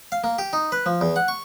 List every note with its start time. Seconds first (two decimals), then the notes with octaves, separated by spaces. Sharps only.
0.12 F5
0.24 A#3
0.39 G4
0.53 D#4
0.72 B4
0.86 F3
1.01 E2
1.16 F#5
1.28 C#6